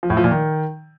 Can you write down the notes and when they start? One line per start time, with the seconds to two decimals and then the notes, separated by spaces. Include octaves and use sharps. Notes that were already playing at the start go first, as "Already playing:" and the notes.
0.03 F3
0.10 A2
0.17 F3
0.24 A#2
0.31 D#3